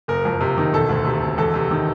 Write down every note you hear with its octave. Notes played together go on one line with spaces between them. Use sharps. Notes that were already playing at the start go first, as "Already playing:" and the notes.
F#1 A#4
F2
C3
D#3
E1 A4
D2
C3
E1
E2 A4
C3
D#3